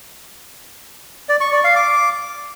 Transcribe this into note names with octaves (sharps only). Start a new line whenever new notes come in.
D5
C#6
D5
F5
D6